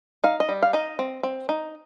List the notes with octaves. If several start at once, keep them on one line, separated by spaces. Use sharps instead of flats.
D#4 F5
D#5
G3
F5
D#4 D#5
C4
C4
D#4